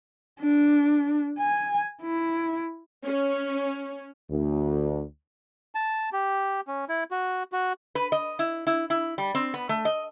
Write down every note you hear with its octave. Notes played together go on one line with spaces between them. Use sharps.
D4
G#5
E4
C#4
D2
A5
G4
C#4
E4
F#4
F#4
B4
D#5
E4
E4
E4
G3
C4
B3
A3
D#5